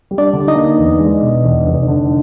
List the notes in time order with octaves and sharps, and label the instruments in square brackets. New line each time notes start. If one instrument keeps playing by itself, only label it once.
[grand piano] G3
[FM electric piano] D4 D5
[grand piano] D3
[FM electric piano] D#4 D#5
[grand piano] A#3
E2
G#3
B2
E2
F1
D3